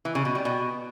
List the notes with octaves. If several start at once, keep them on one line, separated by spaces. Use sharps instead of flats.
E3
C#3
B2
G3
B2